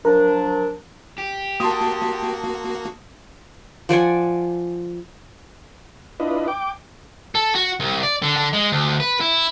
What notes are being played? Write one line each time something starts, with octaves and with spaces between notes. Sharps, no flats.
F3 F#3 D4 A#4
G4
A#3 F#4 A5 C6 D#6
F3 D5 F#5 G#5
D4 E4 F4 B4 D#5
G5 D6
A4
F#4
C2
D5
D3
D3
G#3
D2
B4
E4